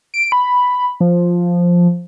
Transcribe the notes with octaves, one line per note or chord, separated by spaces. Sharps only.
D7
B5
F3